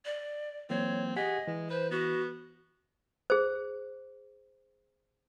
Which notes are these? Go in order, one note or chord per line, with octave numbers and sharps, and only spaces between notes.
D5
E3 F#3 A#3 C4 C#5
G4 G#4 D#5 F#5 B6
E3 G#3
B4 C5
B3 F#4
G#4 C5